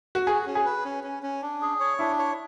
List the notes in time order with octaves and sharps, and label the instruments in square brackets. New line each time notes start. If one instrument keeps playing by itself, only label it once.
[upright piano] F#4
[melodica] F#4 [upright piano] G#4
[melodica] C#4
[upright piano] G#4
[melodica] B4
C#4
C#4
C#4
D4
G#4
C#5
[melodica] D4 [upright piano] E4
[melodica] C#5